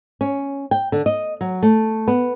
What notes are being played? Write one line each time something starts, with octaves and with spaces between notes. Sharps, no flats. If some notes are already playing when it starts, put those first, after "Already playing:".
C#4
G5
D3
D#5
F#3
A3
B3